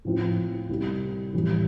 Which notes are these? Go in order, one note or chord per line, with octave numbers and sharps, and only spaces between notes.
A2 F3 C4 F4
C2 C3 G3
A2 E3 G3